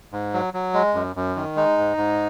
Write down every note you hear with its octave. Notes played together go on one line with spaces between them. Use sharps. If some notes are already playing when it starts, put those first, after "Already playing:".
G#2
F#3
F#3
G#3
F#2
F#2
D#3
G#3 D#4
G#2
G#2